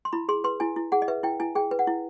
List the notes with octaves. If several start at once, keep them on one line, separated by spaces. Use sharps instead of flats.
C6
E4 B5
G#4 C6
B4 C6
E4 G#5
E4
G#4 F#5
D#5
B4 E5
E4 G5
E4 G#5
G#4 G5
B4
F#5
E4